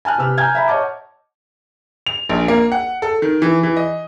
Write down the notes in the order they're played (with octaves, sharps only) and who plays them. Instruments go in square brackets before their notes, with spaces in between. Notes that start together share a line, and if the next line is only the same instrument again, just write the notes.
[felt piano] G#5 A5 F6 F#6
C3 B4 E6 F6
G#5 A#5 F6 G6 G#6
E5 A#5 B5
C#5 D#5 F#5 A5 D6
[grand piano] F7
A#1
A#3
F#5
A4
D#3
E3
E3
D#5